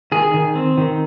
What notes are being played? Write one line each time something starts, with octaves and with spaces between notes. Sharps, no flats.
D#3 G#4
D#3
C4
D#3